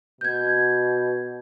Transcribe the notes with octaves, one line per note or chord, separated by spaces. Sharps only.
B2 G6 G#6